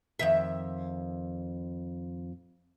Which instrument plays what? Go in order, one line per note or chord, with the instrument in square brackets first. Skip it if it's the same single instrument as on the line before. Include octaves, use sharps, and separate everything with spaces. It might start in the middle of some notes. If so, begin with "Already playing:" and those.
[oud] F2 D#3 E5